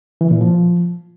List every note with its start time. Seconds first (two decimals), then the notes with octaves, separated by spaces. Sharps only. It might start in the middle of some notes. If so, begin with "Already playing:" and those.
0.21 E3
0.31 A#2
0.41 F3